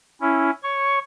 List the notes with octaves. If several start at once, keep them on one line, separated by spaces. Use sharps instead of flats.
C#4 E4
C#5 C#6